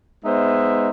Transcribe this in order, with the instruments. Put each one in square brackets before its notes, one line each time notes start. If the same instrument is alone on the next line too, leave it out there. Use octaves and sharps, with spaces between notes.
[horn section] G#3 B3 D#4 C5 E5